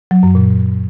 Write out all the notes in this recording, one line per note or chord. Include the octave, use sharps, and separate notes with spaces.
F#3
F#2
A#2